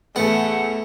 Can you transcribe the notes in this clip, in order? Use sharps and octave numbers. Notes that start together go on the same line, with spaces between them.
E2 A2 A3 B3 F#5